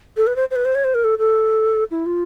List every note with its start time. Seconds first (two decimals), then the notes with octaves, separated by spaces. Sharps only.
0.17 A4
0.27 B4
0.36 C5
0.51 C5
0.56 B4
0.65 C5
0.75 C#5
0.84 C5
0.94 A#4
1.04 A4
1.18 A4
1.91 E4
2.06 F4